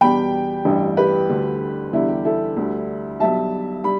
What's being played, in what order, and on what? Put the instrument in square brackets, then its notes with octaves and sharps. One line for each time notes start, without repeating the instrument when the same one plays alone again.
[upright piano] E2 B2 G3 G5 B5
A1 G2 G3
G4 B4
D2 D3 G3
E2 D3 G3 E4
G4
E4 A4
D2 D3 G3
B1 B2 G3 E5 A5
G3 B5